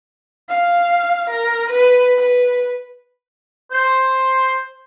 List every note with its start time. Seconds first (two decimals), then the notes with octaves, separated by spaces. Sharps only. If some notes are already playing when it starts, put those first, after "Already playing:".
0.49 F5
1.30 A#4
1.70 B4
2.18 B4
3.72 C5